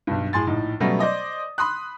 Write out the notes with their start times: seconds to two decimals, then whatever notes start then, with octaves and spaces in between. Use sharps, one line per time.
0.07 B1 G2
0.33 A2 G#4 C6 A6
0.47 A#1 A2 D#4
0.80 B2 F#3 G3 A3 B3 C#4
0.99 C5 D5 D#5 D#6
1.58 B5 C6 D#6 F#6